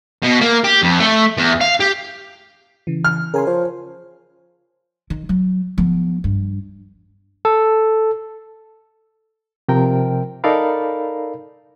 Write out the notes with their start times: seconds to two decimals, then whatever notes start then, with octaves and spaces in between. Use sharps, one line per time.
0.23 B2
0.41 A#3
0.64 G4
0.83 F2
1.00 A3
1.37 E2
1.61 F5
1.80 G4
2.87 C#3 E3
3.04 F6
3.34 C#3 A#4 G#5 C6
3.47 F3 C#5
5.10 D#3
5.29 F#3
5.78 F3 B3
6.24 G2
7.45 A4
9.69 C3 F3 A#4 G5
10.44 D#4 A4 A#4 D5 F5 B5